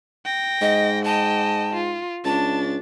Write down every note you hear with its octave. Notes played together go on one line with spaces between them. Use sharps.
G5 A#6
G#2 D#5
D#5 G5 A5
F4
C#2 D4 A5 A6